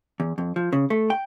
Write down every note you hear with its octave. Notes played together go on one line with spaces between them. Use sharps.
E2
F2
F3
C#3
A3
G5